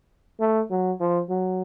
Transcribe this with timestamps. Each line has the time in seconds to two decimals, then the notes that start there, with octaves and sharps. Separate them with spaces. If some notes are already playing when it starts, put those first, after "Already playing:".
0.40 A3
0.70 F#3
1.00 F3
1.29 F#3